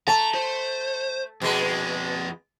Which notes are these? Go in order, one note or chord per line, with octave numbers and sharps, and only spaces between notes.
A3 A5 A#5
C5
F2 B2 G#3 B4